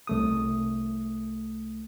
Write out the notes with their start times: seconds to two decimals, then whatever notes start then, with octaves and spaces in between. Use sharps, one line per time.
0.07 C2 A3 D#6